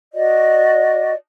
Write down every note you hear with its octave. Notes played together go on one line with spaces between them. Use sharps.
F#4 D5 D#5